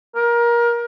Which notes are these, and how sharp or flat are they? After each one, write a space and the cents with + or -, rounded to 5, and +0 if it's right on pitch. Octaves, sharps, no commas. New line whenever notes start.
A#4 +25